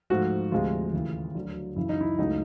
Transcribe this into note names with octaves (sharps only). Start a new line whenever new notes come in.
G#2 F3 A3 F#4
D2 C3 F3 G#3 F4
D#2 C#3 E3 A3
D2 D3 F#3
F#2 C#3 E3 E4
D#4
E4
C#2 C#3 F#3 A3 D#4